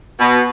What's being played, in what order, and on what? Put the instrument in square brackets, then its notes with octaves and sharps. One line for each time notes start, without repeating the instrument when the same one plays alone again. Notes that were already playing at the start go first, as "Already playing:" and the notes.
[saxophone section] B2